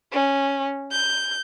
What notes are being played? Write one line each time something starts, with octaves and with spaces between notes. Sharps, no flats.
C#4
G6